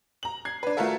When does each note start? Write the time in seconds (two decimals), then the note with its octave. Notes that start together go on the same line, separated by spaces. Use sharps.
0.23 A#5 F#7
0.45 G#6 C7
0.63 D4 B4
0.77 A3 F4 F#4 A4 A#4 E5